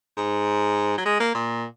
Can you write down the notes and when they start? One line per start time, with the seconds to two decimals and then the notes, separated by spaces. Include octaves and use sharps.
0.17 G#2
0.98 F#3
1.06 G#3
1.20 A#3
1.35 A#2